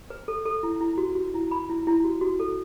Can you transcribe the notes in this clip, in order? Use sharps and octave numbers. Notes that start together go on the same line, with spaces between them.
B4
A4
A4
E4
E4
F#4
F#4
E4
B5
E4
E4
F#4
F#4
A4